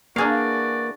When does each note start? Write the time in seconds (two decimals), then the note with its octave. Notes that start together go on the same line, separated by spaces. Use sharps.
0.16 E3 A#3 D4 F#4 G#4 D5 F5